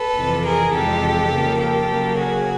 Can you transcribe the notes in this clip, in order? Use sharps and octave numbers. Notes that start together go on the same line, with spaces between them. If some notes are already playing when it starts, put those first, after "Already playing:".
Already playing: A4 B4
F2 C3 E3
G#4 A#4
F2 C3 E3 G#3 G4 A4
C#3 F3 A#3
G4 A4
C#3 F#3 A#3
F#4 G#4